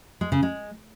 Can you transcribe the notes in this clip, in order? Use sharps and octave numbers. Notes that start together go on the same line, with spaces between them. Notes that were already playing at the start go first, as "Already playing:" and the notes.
G#3
C#3
G#3